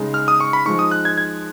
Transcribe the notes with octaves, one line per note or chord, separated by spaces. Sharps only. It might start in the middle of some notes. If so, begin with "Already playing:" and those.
Already playing: C#3 G#3 D#4
F6
D#6
C#6
B5
F3 G#3 D#4 C#6
D#6
F#6
G#6
G#6